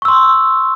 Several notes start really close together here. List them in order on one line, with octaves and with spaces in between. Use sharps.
C#6 E6 C6